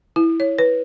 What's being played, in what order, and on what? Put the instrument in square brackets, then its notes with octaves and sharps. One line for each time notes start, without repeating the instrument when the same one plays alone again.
[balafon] E4
C#5
B4